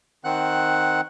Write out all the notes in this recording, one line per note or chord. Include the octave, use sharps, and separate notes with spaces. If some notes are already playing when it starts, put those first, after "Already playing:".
D#3 C4 F#5 F#6